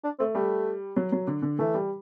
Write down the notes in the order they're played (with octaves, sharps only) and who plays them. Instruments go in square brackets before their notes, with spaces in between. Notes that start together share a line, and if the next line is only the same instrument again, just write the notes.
[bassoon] D4
[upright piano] A3 [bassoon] C4
[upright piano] G3 [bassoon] A3
[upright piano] F#3
F#3
D3
D3
[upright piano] E3 [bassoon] A3
[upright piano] G3